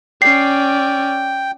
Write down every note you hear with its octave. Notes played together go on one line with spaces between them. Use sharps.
C#4 D5 G5 C7